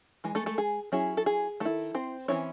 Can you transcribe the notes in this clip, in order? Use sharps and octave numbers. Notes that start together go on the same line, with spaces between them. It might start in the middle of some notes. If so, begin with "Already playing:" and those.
E3 G#3
A3 A4
A3 A4
G#4
F#3 C#4 E4 G#4
A4
G#4
D#3 A3 E4 A4
C4 C5
E3 A3 C4 C#4 E4 C#5